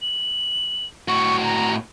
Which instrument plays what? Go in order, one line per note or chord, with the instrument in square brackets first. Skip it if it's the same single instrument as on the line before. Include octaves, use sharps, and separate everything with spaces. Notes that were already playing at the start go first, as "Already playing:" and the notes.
[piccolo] F#7
[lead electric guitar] A2 F#4 [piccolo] C#6
[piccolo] A#5